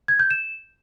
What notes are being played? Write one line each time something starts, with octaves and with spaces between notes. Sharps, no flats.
G#6
G6
E7